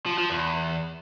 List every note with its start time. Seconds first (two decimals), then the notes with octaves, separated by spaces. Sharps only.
0.06 F3
0.18 F3
0.30 E2